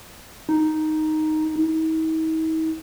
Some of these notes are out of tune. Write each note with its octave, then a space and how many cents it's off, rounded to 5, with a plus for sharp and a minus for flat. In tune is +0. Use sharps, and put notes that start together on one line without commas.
D#4 +0
D#4 +45